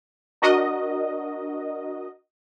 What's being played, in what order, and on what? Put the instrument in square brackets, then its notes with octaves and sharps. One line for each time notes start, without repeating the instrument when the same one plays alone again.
[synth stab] D4 F#4 A#4 D#5